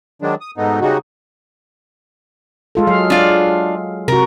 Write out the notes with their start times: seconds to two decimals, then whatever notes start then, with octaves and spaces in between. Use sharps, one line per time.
0.22 D#3 F#3 G#3 D4
0.41 D#6
0.57 G#2 B2 A3 B3 D#4
0.81 C#3 G3 G#3 D#4 F#4
2.75 G#3 F4 A4
2.87 F#3 F5
3.10 D4 F4
4.08 C3 F#4 A#4